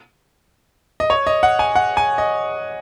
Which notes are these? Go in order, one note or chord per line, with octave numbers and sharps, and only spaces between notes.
D#5
C#5
D#5
F#5
G#5
F#5
G#5
D#5